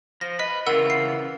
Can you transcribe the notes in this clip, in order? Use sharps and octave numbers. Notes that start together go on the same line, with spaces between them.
F3 A#6
B4 D#5 B6
C#3 E3 F4 A#4 F#5 E6
C7